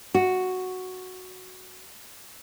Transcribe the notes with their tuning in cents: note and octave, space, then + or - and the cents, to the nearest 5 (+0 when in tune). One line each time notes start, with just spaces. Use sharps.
F#4 +0